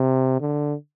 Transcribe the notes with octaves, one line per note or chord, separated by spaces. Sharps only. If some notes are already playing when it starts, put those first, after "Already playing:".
Already playing: C3
D3